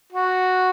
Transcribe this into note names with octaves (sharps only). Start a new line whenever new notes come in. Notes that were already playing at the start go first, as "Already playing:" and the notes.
F#4